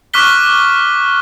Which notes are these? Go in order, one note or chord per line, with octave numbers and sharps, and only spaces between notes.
C#6 D6 F6 F#6 B6 G7